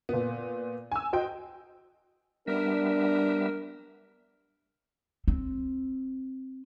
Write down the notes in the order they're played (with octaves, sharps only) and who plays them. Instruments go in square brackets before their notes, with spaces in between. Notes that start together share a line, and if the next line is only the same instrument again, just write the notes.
[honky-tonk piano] A#2 B3
G#5 E6
F#4 C5 D#5 G5
[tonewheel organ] G3 B3 E5 [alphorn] D4 [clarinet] A#4
[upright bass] C4